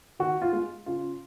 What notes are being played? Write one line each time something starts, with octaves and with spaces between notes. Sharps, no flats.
D#3 F#4
F4
G#3
C#3 F4